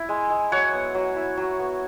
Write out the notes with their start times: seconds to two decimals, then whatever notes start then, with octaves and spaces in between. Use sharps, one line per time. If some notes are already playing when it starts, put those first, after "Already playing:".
Already playing: E4
0.09 G#3
0.30 G#3
0.52 F#3 C#5 F#5
0.73 B3
0.95 F#3
1.16 E4
1.37 F#3
1.60 B3